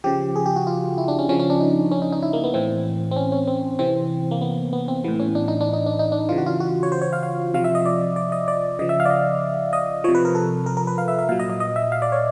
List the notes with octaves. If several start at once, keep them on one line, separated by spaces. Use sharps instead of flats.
C#3 F3 G4
G#4
G4
F#4
F4
E4
D4
C#4
C#3 F3 C#4
C#4
D4
D#4
C#4
D#4
D#4
E4
A#3
B3
A2 E3 C4
C4
C#4
C#4
C4
C3 E3 C4
A#3
B3
B3
C4
A2 E3 B3
C#4
D4
D#4
D4
D#4
D4
D#4
D4
C#3 E3 F4
F#4
F4
F#4
C#5
C5
C#5
F5
F5
C3 F3 F5
E5
D#5
D5
D5
D#5
D5
C#3 F3 D#5
E5
F5
D5
D#5
D#5
C3 F3 C#5
B4
A#4
A4
A#4
A#4
B4
F5
E5
E5
A#2 F#3 F5
D#5
D#5
D#5
E5
F5
D5
C#5